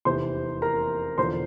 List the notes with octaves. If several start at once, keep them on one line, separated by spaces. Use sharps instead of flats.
F1 E2 C3 E3 C5 C6
A#4 A#5
E1 E2 D3 F3 C5 C6